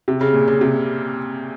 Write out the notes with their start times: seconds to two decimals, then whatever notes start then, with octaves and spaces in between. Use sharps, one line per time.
0.08 C3
0.21 C#3
0.34 A#2
0.48 C#3
0.61 C3